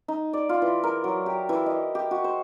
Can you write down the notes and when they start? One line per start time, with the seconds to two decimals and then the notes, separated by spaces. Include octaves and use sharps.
0.08 D#4
0.33 D5
0.49 F4
0.62 E3
0.84 A#4
1.04 F#3
1.26 G4
1.49 E3
1.66 D#5
1.95 G4
2.11 F#4
2.24 C5